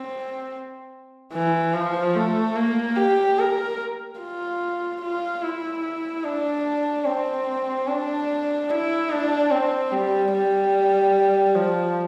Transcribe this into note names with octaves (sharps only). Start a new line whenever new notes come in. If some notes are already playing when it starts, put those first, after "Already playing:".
Already playing: C4
E3
F3
A3
A#3
G4
A#4
F4
F4
E4
D4
C4
D4
E4
D4
C4
G3
G3
F3